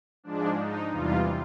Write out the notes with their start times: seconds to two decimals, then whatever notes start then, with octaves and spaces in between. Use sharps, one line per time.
0.24 G#2 F3 G#3 D4
0.57 D#4
0.90 E2 C3 E3 G3 F4